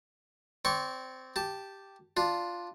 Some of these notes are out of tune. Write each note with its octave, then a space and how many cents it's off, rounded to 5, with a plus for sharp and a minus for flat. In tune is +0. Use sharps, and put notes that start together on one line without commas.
C4 -10 D5 -35 C#6 -15
G4 +0 A5 +0
D4 +0 F4 +0